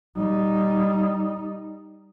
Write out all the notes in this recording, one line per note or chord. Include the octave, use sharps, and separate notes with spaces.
G3 D#4